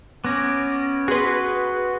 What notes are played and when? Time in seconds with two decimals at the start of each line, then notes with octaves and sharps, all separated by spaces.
0.24 B3 C#4 D6 A#6 D7
1.08 F#4 G#4 B4 C6